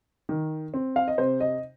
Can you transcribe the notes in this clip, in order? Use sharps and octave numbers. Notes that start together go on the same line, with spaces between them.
D#3
C4
F5
D#5
C3 C5
D#5